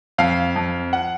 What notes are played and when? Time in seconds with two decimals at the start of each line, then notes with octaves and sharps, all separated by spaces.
0.18 F2 F5
0.56 F2
0.93 F#5